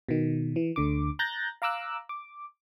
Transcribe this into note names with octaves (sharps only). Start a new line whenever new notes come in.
B2 D#3
E3
D2 D3 D6
A#5 F#6 G6 A6 A#6
F5 A#5 D6 E6 F#6
D6